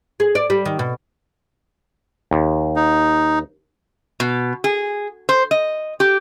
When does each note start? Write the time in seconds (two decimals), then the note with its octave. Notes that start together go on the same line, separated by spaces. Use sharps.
0.20 G#4
0.35 D5
0.50 G3
0.65 D#3
0.79 B2
2.31 D#2
2.76 D#4
4.20 B2
4.64 G#4
5.29 C5
5.51 D#5
6.00 G4